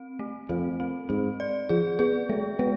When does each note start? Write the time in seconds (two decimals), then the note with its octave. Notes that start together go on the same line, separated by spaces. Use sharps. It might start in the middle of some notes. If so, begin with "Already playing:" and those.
Already playing: C4
0.19 A3
0.49 F2 C4
0.80 C4
1.09 G#2 C4
1.40 D5
1.69 F3 G#4
1.99 B3 G#4
2.29 G#3 A3
2.59 G#3 B3